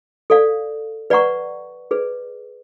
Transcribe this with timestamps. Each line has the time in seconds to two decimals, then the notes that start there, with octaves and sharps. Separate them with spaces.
0.30 A4 D5 F5
1.10 B4 D5 F#5 A#5 C#6
1.91 G#4 B4 D5